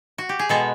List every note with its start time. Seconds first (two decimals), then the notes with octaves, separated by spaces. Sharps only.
0.18 F#4
0.29 G4
0.39 G#4
0.49 B2 G#3 B3 A4